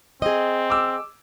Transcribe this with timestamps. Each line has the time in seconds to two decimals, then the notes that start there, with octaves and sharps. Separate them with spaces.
0.22 C4 G#4 D#5
0.70 D6 E6